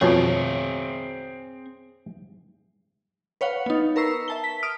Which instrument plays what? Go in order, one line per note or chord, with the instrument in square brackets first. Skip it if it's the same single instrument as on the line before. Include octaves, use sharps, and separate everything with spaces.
[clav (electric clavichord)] F2 B2 F3 [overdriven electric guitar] C4 G#4 [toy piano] C#5 F5 C#6
[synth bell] B4 C#5 F5 F#5
B3 D#4
A#4 B4 A#5 C#6 E6 C7
E5 A5 G7
B6
D#6 F6 D7